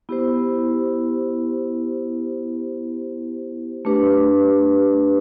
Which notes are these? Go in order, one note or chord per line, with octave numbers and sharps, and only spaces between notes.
B3 E4 G4 C5
A3 D4 G4 B4